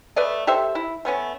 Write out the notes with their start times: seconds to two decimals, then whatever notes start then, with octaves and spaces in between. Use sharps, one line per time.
0.16 A3 B4 D5 D#5
0.47 G4 A4 C5 E5
0.75 E4
1.05 A3 B3 C#4